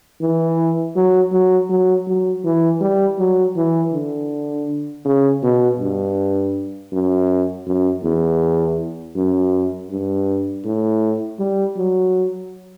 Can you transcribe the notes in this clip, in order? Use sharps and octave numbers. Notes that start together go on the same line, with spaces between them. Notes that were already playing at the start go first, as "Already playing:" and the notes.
E3
F#3
F#3
F#3
F#3
E3
G3
F#3
E3
D3
C#3
B2
G2
F#2
F#2
E2
F#2
G2
A2
G3
F#3